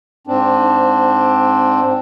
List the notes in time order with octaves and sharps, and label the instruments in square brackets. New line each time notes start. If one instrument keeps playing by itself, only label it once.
[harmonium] G#2 C4 D4